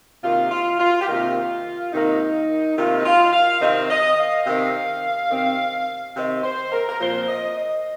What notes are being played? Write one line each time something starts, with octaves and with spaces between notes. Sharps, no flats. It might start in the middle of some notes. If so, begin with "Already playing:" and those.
C3 D#3 A#3 F4
F4
F4
G4
C3 D#3 A#3 F4
C3 D#3 A#3 D#4
C3 D#3 A#3 F4
D#4
F4
F5
C3 D#3 C4 D#5
D#5
F5
C3 D#3 C4
C3 D#3 C4
C3 D#3 C4 D#5
C5
A#4
A#4
A#2 F3 C4 C5
D#5
D#5